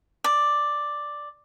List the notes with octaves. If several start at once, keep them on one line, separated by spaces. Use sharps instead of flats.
D5